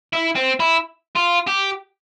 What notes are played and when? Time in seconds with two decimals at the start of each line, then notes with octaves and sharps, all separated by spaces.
0.13 E4
0.36 C4
0.60 E4
1.15 F4
1.47 G4